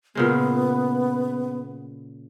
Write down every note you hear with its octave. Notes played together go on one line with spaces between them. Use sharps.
A#2 C#3 G#3 B3